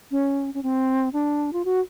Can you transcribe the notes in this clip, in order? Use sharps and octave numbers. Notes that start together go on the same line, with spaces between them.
C#4
C#4
C4
D4
F4
F#4